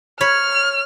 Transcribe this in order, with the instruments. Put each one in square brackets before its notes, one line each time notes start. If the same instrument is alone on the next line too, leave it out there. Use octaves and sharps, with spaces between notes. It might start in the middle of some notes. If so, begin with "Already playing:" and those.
[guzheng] C#5 B5 [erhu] F6